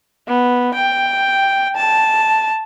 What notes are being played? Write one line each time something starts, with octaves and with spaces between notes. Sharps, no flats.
B3
G5
A5